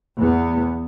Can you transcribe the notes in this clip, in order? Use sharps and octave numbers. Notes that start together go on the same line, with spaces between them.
E2 B3